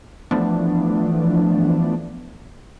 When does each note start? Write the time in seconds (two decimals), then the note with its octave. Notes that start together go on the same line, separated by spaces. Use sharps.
0.31 E3 F3 A3 B3 D4